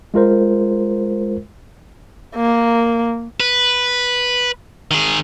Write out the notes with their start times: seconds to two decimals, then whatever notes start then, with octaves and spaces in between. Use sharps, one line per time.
0.14 G#3 F4 A#4 C5
2.36 A#3
3.40 B4
4.91 D#3 G#4